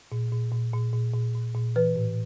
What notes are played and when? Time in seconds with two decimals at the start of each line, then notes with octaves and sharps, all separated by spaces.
0.12 A#2
0.32 A#2
0.52 A#2
0.73 A#2
0.93 A#2
1.14 A#2
1.35 A#2
1.54 A#2
1.76 E3 B4
1.95 A2